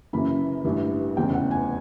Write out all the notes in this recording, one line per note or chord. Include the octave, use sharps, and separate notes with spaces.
F#1 F#2 C#3 E3 B5
A1 G2 E3
F1 E2 C#3 E3 G5
F#5
G#5